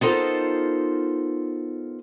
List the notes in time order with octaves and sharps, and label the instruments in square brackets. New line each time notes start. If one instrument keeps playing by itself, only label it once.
[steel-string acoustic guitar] B3 D#4 F4 A4 A#4 C5